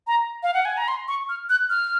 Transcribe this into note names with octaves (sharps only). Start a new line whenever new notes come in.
A#5
F5
F#5
G#5
A#5
C6
C#6
F6
F#6
F6